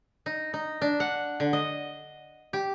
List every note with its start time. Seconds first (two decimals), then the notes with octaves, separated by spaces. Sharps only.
0.26 D#4
0.54 D#4
0.81 D4
1.00 F#5
1.40 D3
1.53 D#5
2.53 G4